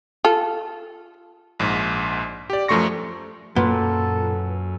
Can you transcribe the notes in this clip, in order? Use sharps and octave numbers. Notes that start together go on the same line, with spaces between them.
F4 A4
A#1 G#2
G4 D5
F#2 F3 A3 C6 C#6 A#6
F#2 A#2 F#3 A4 B4 F#5